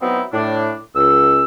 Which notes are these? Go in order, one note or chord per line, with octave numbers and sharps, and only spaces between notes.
F#3 B3 C4 D#4 E4
A2 D4
C#2 E6